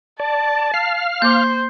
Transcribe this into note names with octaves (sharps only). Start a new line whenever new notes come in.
D5 A5
F5 F6 C7
A#3 C5 D6 G6